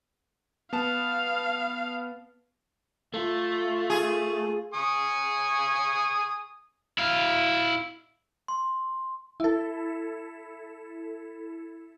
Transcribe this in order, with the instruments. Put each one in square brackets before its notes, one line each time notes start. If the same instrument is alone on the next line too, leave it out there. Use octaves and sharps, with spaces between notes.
[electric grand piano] B3 A5 [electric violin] F5
[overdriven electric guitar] A3 [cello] F4
[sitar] G#4
[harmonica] G#5 C#6 D#6
[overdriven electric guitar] E4 F5
[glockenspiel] C6
[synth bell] E4 A4